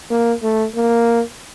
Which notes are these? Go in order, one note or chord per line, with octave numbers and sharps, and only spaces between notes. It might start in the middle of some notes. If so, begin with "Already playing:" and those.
A#3
A3
A#3